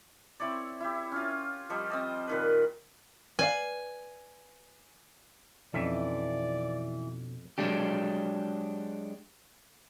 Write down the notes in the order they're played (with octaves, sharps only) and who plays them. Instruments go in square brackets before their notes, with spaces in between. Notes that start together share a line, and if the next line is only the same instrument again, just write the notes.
[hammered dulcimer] C4 E4 C#5 D5
E4 G4
C#4 F4
F3 G3 D#5
C4 D#5 A5
A#2 D#3 B4
[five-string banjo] B4 D5 F5 [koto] G#5
[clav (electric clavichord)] F2 E5 [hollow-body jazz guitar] B2 C#4 D#4 [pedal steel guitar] E3 [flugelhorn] D5
[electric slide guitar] F#3 G#3 D4 G4